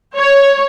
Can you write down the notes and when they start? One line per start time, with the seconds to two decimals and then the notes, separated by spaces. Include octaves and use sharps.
0.17 C#5